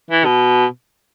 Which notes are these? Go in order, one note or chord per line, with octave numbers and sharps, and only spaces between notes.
E3
B2